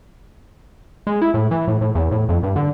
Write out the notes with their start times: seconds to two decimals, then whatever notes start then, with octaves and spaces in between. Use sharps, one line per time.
1.07 G#3
1.22 E4
1.34 A2
1.51 E3
1.68 A2
1.81 A2
1.95 E2
2.11 A2
2.29 F2
2.43 G2
2.56 D3